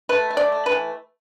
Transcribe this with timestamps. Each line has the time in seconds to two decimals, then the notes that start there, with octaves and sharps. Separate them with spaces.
0.09 A3 B4
0.30 A3
0.37 D5
0.52 A3
0.66 B4
0.72 E3